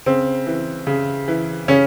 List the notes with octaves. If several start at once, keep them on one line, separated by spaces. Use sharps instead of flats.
C#3 C4
E3
C#3
E3
C#3 C#4